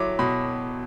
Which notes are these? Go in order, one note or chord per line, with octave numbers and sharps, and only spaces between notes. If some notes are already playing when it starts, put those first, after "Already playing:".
Already playing: F#3 E4 D6
B2 B5